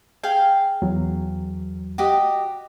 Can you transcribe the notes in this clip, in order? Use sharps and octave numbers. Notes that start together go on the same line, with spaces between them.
G#4 F5 G5
E2 F#3
F#4 G4 D#5